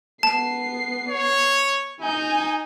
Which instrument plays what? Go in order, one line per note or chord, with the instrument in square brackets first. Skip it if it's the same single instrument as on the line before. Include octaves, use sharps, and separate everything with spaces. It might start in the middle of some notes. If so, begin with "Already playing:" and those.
[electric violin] B3 C7 [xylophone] A5
[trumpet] C#5
[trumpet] D#4 [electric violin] G#5 G6